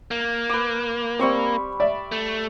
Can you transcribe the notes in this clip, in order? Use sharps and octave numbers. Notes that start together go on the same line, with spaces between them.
A#3
B4 D6
G3 C4 C#6 E6
D5 E5
A3